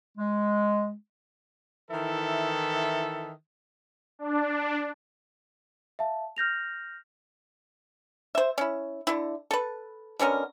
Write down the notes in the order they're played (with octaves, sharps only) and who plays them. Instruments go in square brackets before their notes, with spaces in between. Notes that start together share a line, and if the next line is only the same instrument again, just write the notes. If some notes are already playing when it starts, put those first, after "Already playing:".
[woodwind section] G#3
[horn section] D#3 E3 E4 A4 E5
[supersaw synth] D4
[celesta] E5 F5 A5
F6 G6 A#6 F7
[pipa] C5 E5
C#4 E4
D3 E4
A4 B4
B2 D3 C#4 A#4